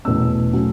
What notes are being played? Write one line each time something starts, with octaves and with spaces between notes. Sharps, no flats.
E2 B2 A3 C#4 E6
F#3 A3 C#4